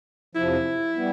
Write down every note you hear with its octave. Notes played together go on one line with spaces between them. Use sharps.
F2 C3 F3 E4
G3 B3